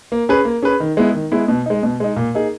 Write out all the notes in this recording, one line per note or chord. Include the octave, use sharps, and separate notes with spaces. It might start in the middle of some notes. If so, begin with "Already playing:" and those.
A#3
C#4 G#4 B4
A#3
C#4 G#4 B4
D#3
G#3 B3 E4
D#3
G#3 B3 E4
B2
G#3 D#4
B2
G#3 D#4
A#2
A#3 D#4 G#4